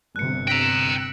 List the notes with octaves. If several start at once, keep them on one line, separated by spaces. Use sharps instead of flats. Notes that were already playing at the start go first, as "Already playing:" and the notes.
G1 C3 F#6 C#7
G5 A#5 E6 F#6 A#6 B6 D7